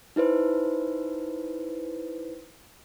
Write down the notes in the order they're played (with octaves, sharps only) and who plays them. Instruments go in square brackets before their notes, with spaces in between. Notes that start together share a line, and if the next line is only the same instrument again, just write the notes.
[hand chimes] D#4 E4 B4 C5